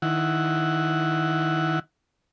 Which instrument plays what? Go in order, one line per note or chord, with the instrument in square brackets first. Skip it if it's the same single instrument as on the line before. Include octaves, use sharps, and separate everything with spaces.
[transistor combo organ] D#3 E4 F#5